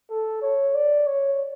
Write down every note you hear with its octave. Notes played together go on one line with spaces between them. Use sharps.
A4
C#5
D5
C#5